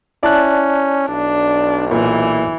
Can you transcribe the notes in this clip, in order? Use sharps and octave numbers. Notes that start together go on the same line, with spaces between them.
C#4 E4 D5 A5 F#6
B1 D4
A#2 E3